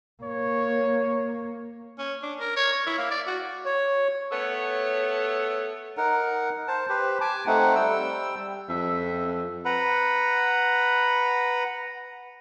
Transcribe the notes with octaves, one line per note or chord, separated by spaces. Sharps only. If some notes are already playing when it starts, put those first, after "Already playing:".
A#3 C#5
C#4
D4
A#4
C#5
C#5
E4
A#3
D5
F#4
C#5
A3 B3 A4 C#5
D#4 A#4 F#5
C5 A5
G4 B4 C5
G#5 A5 D6
A3 C4 D#4 F#5
G3 G5 E6
F2 E5
B4 F#5 A#5 B5